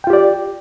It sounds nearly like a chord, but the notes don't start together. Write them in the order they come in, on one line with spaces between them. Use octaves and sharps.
G5 F4 G4 D5